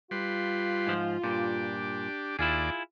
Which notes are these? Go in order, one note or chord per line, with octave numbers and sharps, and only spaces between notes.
G3 F4 B4 C6
G#2 F3
G2 A#2 D4 G4
D#2 E4 F4 G#4 D5